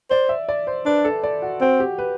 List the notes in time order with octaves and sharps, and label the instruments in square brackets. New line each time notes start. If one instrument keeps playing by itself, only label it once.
[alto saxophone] C5 [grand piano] D5
[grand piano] E5
D5
C5
[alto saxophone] D4 [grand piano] B4
[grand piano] A4
D5
F#4
[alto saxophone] C4 [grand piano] F#4
[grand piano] G4
B4